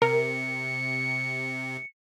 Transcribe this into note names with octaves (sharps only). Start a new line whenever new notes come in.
C3 A#4 C#7